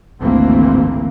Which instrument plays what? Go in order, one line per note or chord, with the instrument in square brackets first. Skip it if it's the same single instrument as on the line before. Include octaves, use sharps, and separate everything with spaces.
[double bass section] G#1 D2 E3 A3 A#3 C4